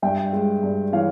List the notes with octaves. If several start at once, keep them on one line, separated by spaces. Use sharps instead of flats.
G2 E5 G5
G#3
G2
E3 C#5 F5